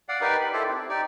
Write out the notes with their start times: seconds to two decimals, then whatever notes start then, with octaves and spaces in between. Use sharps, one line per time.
0.09 D5 F5 F#5
0.21 D#4 G4 A#4 B4 D5
0.41 B5
0.53 E4 G4 A4 C5
0.68 C4
0.89 D#4 G4 D5